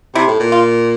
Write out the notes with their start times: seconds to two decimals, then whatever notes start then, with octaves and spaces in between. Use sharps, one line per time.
0.15 C3 E4
0.27 A2
0.40 A#2
0.52 F4